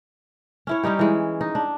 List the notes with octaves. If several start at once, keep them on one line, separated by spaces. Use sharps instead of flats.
C#4 E4 C#5
G3 C#4 D#4 G4
E3 G#3
D#4
D4